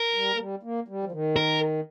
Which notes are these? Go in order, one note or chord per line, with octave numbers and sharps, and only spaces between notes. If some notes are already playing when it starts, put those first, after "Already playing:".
Already playing: A#4
G3
A#3
G3
A#3
G3
F3
D#3
A#4